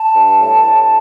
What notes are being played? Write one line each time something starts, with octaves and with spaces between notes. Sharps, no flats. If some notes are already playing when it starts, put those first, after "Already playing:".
Already playing: A5
G2
A2
A2